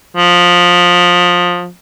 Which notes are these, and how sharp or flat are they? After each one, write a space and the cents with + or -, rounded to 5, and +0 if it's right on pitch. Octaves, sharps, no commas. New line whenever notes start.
F3 +20